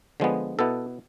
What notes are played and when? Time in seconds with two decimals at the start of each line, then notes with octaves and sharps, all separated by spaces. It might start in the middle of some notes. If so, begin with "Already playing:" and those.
0.20 D3 F3 G#3 B3
0.59 B2 B3 E4 A4